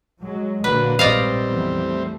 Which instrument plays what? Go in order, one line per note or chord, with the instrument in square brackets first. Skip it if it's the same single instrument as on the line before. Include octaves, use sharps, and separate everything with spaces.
[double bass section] F#3 G#3
[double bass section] A#1 A#3 [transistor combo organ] D3 F#3 [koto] B4
[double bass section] A#1 G#2 [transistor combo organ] G3 C4 [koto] D5 D#5 F5
[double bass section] F2 E3 B3
A3